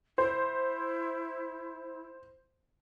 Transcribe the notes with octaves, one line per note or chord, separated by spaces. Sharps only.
E4 C5